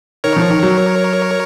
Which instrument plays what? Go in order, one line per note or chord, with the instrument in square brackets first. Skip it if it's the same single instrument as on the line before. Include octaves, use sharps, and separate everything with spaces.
[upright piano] D#3 [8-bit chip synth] A#4 C#5
[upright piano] F3
D#3
F#3